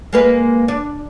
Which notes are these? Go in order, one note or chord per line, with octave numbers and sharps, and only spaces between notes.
G#3 A#3 B4
D4